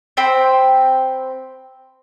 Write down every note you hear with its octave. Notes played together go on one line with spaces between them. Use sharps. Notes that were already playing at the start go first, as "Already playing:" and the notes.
C4 C5 G5 B5